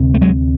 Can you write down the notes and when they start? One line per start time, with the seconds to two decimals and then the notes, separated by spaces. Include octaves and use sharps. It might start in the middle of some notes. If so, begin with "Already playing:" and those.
Already playing: D2 C3
0.14 A3
0.21 F#3 G#3